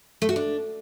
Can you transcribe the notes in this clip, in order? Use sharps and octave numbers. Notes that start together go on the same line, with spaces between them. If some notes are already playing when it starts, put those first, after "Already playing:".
A3
F#4
D4